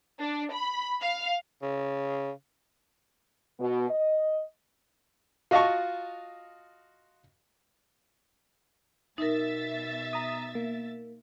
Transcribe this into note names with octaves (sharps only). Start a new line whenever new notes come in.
D4
B5
F5
C#3
B2
D#5
F4 F#4 D#5 F5 A5 C#6
B2 D#4 A#4 E5 A6
A#5 D#6
A#3